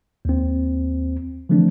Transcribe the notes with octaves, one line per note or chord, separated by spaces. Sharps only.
D#2 C4
D3 E3 F3 A3 C4 D4